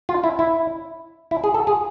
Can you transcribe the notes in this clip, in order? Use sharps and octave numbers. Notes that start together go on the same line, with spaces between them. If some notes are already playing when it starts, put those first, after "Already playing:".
F4
E4
E4
E4
G#4
A4
G#4